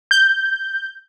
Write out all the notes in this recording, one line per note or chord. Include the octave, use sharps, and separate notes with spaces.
G6